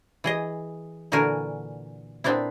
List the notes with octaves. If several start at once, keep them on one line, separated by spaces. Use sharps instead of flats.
E3 G#4 D#5
A#2 D3 E3 F#4 A#4 G#5
A#2 B3 C4 D4 E4